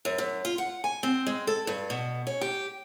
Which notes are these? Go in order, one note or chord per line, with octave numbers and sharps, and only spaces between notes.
F#2
F#2
F4
F#5
G#5
C4
G#3
A4
G2
B2
C#4
G4